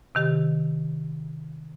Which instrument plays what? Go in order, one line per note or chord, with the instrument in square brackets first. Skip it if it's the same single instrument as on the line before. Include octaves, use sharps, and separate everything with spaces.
[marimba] C3 D#3 G4